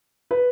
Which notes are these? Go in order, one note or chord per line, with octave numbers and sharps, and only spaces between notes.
B4